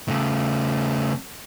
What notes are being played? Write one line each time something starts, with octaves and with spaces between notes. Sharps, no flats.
C#3 A3